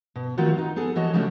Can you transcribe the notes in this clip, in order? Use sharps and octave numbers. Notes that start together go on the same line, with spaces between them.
B2
D#3 A3 C4 F4 F#4
D#4
B3 G#4 A4
E3 F#4 C#5 D#5 A5
C#3 F3 G#3 A3 C#4 D4